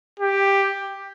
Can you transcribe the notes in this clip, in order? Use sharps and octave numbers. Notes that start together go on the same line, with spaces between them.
G4